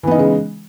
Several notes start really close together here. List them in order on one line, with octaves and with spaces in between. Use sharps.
E3 B3 D#4 C#3 G#3